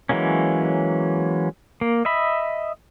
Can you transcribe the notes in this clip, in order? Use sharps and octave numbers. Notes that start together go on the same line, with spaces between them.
E3 F#3 G#3 A#3 C#4
A#3
D#5 E5 B5